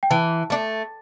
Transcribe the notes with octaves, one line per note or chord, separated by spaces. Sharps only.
G5
E3 A5
A3 D4